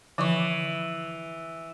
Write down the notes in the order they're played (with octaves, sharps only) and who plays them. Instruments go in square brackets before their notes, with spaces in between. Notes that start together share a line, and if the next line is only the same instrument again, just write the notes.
[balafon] D3 F3 C#6 [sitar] E3